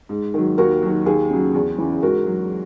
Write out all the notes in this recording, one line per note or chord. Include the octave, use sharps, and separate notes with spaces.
G#2
D#3 F#3
D#2 F#4 A#4
D#3 F#3
D#2 G#4
C#3 F#3
E2
C#3 E3
G#2 F#4 A#4
F#3